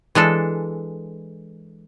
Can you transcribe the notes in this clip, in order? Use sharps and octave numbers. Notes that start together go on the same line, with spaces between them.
E3 G#3 D4 A4